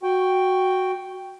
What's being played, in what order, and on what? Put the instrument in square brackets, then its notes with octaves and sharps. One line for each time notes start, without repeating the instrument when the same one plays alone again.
[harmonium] F#4 G5